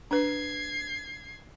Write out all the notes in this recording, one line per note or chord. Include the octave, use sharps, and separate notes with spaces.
D4 B4 G#6 C7